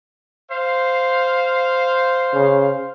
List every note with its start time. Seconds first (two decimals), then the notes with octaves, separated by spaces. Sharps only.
0.51 C5 F5
2.34 C#3